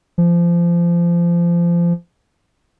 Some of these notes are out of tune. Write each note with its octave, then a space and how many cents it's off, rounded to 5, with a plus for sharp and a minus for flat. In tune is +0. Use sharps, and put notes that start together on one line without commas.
F3 -25